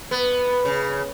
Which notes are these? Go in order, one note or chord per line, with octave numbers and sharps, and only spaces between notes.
B3
C#3